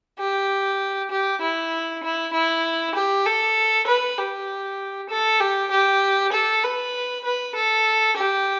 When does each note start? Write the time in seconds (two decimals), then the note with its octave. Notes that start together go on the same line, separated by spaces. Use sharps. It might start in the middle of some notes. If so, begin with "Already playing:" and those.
0.19 G4
1.11 G4
1.42 E4
2.04 E4
2.34 E4
2.95 G4
3.26 A4
3.88 B4
4.18 G4
5.10 A4
5.41 G4
5.71 G4
6.33 A4
6.64 B4
7.25 B4
7.56 A4
8.17 G4